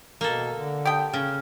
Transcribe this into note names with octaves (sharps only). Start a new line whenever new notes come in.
B2 A#3 A4
D3
G4 G5 A5 D#6 D7
C#3 F6